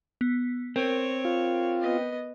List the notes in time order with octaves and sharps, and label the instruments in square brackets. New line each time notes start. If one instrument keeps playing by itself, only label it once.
[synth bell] B3
[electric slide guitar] C4 [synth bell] A#4 [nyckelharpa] C#5
[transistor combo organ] F4
[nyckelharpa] B3 D#5